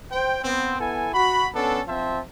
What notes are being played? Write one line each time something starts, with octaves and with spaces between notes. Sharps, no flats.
C5 G5
B3 C4
B3 E4 A4 G#5
F#4 B5
B3 C#4 D4 A4
F3 C4 C5 E5 A5